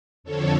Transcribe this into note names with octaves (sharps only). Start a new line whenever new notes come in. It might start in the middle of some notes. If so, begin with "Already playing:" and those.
F2 D3 F3 A4 C#5